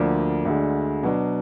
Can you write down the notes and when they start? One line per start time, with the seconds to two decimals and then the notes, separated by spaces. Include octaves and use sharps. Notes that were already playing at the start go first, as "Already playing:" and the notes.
Already playing: D2 D3 F3 A#3 D4
0.45 D2 D3 G#3
1.03 B2 F#3 D4